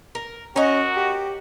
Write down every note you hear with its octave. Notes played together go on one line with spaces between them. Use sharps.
A#4
C#4 F#4 A#4 D#5
G4